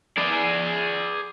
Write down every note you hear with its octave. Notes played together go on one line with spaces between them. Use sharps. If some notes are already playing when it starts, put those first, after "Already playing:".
G#4 D5